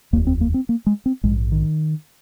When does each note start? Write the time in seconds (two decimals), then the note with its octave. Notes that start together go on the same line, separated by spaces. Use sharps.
0.13 D#2 A#3
0.16 F1
0.27 C4
0.41 A#3
0.54 C4
0.69 A#3
0.86 G#3
1.06 C4
1.24 A#1 G#2 G#3
1.52 D#3